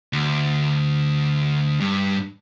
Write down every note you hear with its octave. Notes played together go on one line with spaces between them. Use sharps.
D2
G2